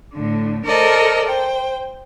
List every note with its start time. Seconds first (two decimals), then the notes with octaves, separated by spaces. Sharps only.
0.13 A2 D3
0.65 A4 A#4 C5 D5 D#5
1.26 C5 G5